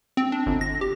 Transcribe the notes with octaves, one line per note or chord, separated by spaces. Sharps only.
C4
D4
G1
A#6
G4